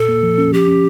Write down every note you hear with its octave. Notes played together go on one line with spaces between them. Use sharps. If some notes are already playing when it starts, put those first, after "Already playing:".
Already playing: A#2 A4
A#3
F3
C#4
F3 G4
C#4